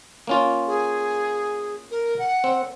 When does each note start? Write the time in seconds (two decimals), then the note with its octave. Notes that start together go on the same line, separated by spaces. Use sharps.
0.27 A#3 C#4 F4
0.67 G#4
1.91 A#4
2.19 F#5
2.44 C4